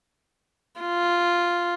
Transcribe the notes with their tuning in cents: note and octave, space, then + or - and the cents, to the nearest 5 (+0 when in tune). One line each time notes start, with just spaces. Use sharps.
F4 -5